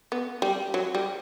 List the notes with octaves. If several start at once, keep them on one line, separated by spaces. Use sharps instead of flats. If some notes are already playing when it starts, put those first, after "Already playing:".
B3
G3
F#3
G3